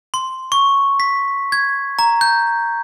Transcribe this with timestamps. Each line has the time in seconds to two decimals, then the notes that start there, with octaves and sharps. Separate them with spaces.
0.14 C6
0.52 C#6
1.00 B6
1.52 G#6
1.99 A#5
2.21 G6